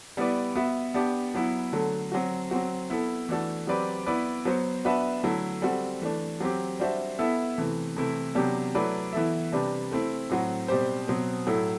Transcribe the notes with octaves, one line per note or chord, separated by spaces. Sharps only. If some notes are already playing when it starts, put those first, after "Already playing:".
G3 B3 E4 B4 D5
B3 F#4 B4 E5
B3 D4 G4
F#3 B3 E4
D3 F#3 A3
F#3 C4 F#4
F#3 C4 F#4
B3 E4 A4
E3 A3 D4 F#4 A4
F#3 C4 G4 B4 D5
B3 E4 B4 D5
F#3 B3 F#4 C5
B3 D4 F#4 B4 E5
D3 F#3 A3 E4
G3 C4 F#4 A4
E3 A3 D4
F#3 C4 G4
G3 D4 F#4 C5 E5
B3 E4 A4 E5
C3 E3 A3
C3 E3 A3 E4
C3 F#3 B3 D4 G4
F#3 A3 E4 B4 D5
E3 B3 E4 A4 E5
C3 G3 D4 G4 B4
A3 C4 E4
A2 F#3 C4 F#4
B2 G3 C4 G4 C5
B2 F#3 C4
A2 F#3 A3 E4 A4